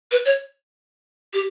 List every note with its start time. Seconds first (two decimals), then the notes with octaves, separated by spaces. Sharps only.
0.12 B4
0.25 C#5
1.33 G4